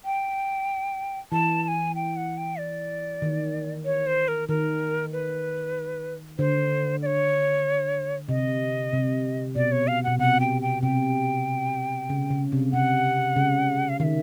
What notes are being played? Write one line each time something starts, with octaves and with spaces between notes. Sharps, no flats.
G5
E3 A5
A5
G#5
G5
F#5
G5
D5
D#3
C#5
C5
A#4
D#3 A#4
B4
D3 C5
D5
C#5
C3 D#5
C3
B2 D5
C#5
F5
B2 F#5
C3 F#5
G5
G5
C3 G5
C#3
C#3
C3
C3 F#5
C#3
F5
D#3 E5 F5